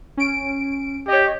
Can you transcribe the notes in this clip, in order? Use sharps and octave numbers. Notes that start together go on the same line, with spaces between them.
C#4 D7
G4 C#5 D#5